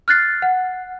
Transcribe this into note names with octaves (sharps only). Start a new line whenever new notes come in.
F6 F#6 A6 C7
F#5